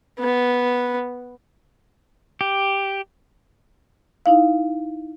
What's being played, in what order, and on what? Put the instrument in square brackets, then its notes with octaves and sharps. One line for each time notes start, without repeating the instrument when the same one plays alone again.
[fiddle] B3
[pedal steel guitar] G4
[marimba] D#4 E4 F5